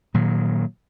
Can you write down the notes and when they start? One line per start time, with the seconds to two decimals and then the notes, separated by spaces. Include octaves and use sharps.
0.14 A#2 D#3 F#3